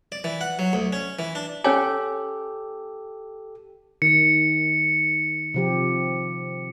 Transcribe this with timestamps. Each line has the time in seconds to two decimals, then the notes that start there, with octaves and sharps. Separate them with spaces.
0.12 D5
0.24 E3
0.41 F#5
0.59 F#3
0.73 D2
0.93 C#4
1.19 E3
1.35 D4
1.64 C#4 G4 A4 C#5 G#5
4.02 D#3 C#7
5.54 C3 F3 G4